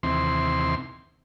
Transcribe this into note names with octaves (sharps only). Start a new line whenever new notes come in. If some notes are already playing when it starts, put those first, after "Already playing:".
D#2 C3 E3 C4 C6